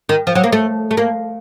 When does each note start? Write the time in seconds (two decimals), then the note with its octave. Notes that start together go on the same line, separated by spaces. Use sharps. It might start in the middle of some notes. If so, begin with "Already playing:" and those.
0.09 D#3
0.27 F3
0.35 F#3
0.44 A#3
0.52 A3
0.91 A3
0.97 A#3